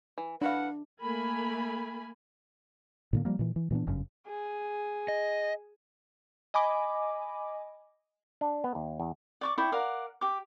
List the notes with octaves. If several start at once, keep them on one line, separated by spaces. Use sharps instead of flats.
E3
D4 E4 B4 F5 F#5
A3 A#3 A#4 G#5 B5
A2 D3 A#3
F3 G3 A#3
A#2 E3
E3
A#2 E3 B3 D4
G1 F#2 C#3
G#4
D#5
D#5 G#5 B5 D6
D4
B3
D#2
E2
D5 C#6 D6
E4 D5 G5 C#6
A#4 D5 F5 F#5
G4 D6